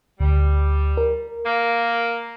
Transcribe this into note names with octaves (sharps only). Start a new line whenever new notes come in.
D2 G3
A#4
A#3